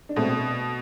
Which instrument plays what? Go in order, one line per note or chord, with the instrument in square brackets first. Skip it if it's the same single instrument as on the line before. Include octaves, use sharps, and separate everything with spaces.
[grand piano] D4
[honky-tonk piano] B2 [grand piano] A3 C4